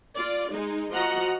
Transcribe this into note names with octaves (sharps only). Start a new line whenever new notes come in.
F4 D5
G#3 D#4
F3 F#4 D#5 F#5 A#5